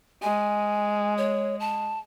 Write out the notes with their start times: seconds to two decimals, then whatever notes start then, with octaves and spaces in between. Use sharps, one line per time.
0.22 G#3 G#5
1.18 C#5
1.60 A5